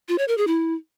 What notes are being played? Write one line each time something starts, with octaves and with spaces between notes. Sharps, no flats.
F4
C#5
A#4
G#4
E4